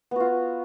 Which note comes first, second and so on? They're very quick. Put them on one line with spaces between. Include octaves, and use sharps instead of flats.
B3 F#4 F4